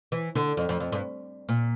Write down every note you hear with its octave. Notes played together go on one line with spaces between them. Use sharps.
E3
D3
F2
F2
F2
G2
A#2